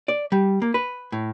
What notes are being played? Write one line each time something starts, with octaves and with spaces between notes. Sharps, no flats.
D5
G3
A#3
B4
A2